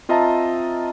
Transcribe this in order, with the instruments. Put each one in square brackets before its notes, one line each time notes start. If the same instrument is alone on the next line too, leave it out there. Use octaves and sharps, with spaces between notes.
[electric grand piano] C4 F4 D#5 E5 A5 A#5